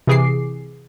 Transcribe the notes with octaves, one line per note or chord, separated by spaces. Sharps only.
C3 E3 G#4 D6 C7